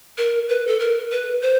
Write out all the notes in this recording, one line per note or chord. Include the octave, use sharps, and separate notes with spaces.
A#4
B4
A4
A#4
B4
C5